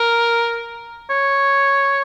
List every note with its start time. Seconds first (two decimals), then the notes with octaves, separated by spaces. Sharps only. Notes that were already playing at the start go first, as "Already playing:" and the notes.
Already playing: A#4
1.10 C#5